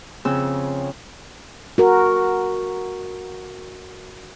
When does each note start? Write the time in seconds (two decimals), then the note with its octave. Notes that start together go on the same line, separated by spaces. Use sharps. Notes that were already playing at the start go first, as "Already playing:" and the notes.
0.25 F2 C#3 C4 C#4 E6
1.78 F#4 A#4